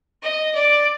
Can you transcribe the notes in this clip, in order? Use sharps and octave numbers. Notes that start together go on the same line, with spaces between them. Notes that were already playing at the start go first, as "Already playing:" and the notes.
D#5
D5